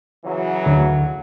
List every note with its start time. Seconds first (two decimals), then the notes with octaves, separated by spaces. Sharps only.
0.25 C#3 E3 F#3
0.66 D2 D3